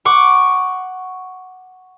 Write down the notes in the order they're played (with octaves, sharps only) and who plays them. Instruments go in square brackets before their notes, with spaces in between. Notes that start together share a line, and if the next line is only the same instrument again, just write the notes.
[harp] F#5 C#6 D6